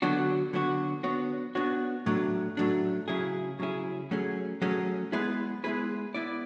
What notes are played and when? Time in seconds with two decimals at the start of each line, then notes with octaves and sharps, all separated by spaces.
0.02 D3 F#3 B3 D4 F#4
0.53 D3 F#3 B3 D4 F#4
1.03 B3 D4 F#4 C#5
1.55 B3 D4 F#4 C#5
2.06 A2 F#3 A3 D4
2.57 A2 F#3 A3 D4
3.08 C#3 F#3 C#4 E4 G#4
3.59 C#3 F#3 C#4 E4 G#4
4.11 F#3 A3 C#4 G#4
4.62 F#3 A3 C#4 G#4
5.12 G#3 B3 E4 G#4 B4
5.64 G#3 B3 E4 G#4 B4
6.14 B3 E4 B4 D5